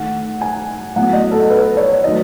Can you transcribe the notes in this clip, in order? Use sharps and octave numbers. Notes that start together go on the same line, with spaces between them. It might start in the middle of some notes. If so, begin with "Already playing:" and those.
Already playing: D#3 A3 F#5
G#5
A2 F#3 B3 F#5
D#5
A4
B4
C#5
D#3 F#3 A3 D#5